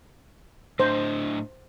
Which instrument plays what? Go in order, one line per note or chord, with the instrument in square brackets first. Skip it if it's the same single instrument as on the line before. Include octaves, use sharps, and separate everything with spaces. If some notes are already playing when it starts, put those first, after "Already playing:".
[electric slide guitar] A2 D4 D#5 [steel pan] C5